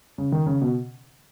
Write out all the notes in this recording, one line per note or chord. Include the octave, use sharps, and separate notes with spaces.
C#3
D#3
C#3
B2